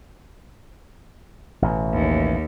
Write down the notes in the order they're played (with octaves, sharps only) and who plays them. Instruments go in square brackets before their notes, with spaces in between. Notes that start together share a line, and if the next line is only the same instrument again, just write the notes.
[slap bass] A1 B2
[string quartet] D#2